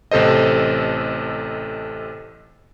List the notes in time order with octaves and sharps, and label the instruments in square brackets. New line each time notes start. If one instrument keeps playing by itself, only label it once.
[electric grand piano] A1 C3 A4 C5 D#5